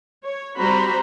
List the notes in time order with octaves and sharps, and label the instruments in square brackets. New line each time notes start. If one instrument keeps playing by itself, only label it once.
[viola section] C#5
G3 C4 F#4 C5 A#5 B5